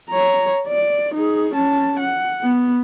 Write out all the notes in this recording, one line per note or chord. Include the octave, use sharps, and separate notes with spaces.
C#5 A#5
D5
D#4 G#4
C#4 A5
F#5
B3